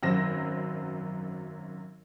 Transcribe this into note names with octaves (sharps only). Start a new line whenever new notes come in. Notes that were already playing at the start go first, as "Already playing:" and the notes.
G#1 F#2 F#3 C5 A#6 E7